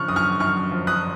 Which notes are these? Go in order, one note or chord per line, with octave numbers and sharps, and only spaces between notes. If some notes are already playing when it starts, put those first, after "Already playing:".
Already playing: C#3 F3 C#6 F6 F#6
F#2 D#6
C#6 F6
F#2 C#6 F6
F3
D#6 F#6